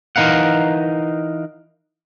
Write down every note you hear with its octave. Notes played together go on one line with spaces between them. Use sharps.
E3 D#4 A#4 F5 F#5